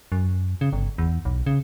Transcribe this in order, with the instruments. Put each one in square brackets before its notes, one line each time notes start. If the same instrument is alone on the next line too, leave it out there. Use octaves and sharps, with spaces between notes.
[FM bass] F#2
C#3
G1
E2
B1
C#3